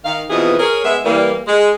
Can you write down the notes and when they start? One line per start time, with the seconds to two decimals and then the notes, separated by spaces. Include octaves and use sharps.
0.05 D#3 F5
0.30 F2 B2 E3 F3 G#4 D#5
0.59 G#4 A#4 C#5
0.84 G#3 B3 E5
1.05 E3 G3 A#3
1.48 G#3